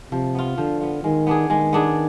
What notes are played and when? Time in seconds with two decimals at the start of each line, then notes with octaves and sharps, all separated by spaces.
0.12 C3 F3
0.35 B3 F4
0.58 D3 F3
0.81 B3 F4
1.04 D#3 G#3
1.27 B3 D4 G#4
1.49 D#3 G#3
1.73 B3 D4 G#4